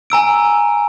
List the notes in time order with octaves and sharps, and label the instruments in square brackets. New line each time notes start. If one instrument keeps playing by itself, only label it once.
[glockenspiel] G#5 A#5 E6 D7